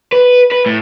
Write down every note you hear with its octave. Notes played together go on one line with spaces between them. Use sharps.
B4
B4
A2